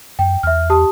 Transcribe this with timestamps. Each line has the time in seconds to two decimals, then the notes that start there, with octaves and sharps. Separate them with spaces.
0.19 F#2 G5
0.43 E2 E5 F6
0.70 G4 A5 D#6